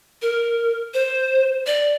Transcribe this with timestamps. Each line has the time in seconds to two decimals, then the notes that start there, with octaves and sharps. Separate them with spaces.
0.22 A#4
0.94 C5
1.67 D5